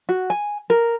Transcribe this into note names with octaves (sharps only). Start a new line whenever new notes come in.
F#4
G#5
A#4